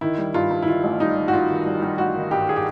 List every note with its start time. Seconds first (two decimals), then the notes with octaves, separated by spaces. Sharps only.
0.01 D#3 E4
0.18 G3
0.34 G2 F4
0.51 G2
0.62 E4
0.68 D#3 F4
0.83 A1
1.00 G3 D#4
1.16 A1
1.28 F#4
1.33 G3 F4
1.50 D#3
1.66 G3
1.82 G3
1.98 A1 F#4
2.15 D#3
2.31 G2 G4
2.49 G#4
2.56 G4